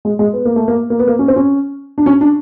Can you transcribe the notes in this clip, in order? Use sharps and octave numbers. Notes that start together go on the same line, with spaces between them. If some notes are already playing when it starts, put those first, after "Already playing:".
G#3
G#3
B3
A#3
A3
A#3
A#3
B3
A#3
C#4
C4
C#4
D4
C#4
D4